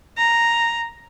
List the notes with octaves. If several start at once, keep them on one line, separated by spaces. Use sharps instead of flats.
A#5